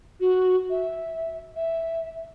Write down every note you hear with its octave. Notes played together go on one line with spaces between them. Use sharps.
F#4
E5
E5